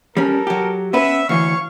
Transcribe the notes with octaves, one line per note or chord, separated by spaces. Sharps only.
G3 C#4 A4 A#4
F#3 G4
B3 C#4 B4 E5
D2 E3 C#5 F5 C#6